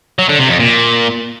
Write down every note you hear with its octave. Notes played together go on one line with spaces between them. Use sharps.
F#3
D3
C3
F2
A#2